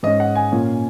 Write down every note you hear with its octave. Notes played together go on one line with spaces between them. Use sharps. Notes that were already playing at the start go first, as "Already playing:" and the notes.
G#2 G#3 C#4 D#5
F#5
G#5
A#2 A#3 C#4